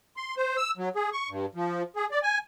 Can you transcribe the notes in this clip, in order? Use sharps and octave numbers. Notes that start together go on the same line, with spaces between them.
C6
C5
E6
F#3
G#4
C#6
G2
F3
G#4
D5
G#5